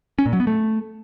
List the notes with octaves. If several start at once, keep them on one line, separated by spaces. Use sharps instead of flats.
C#4
A#2
F#3
B3
A3